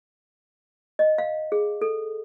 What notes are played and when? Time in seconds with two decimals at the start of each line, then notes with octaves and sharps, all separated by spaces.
0.99 D#5
1.18 F5
1.52 G#4
1.81 A4